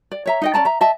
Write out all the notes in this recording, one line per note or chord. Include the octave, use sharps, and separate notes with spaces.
D5
C#5 E5 A#5
D#4 D#5 G5
C#4 D5 A5 A#5
E5 A#5
D#5 E5 A5